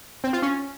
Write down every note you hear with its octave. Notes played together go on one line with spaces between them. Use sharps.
C4
F4
C#4